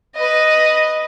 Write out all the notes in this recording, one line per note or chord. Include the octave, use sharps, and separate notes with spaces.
B4 D#5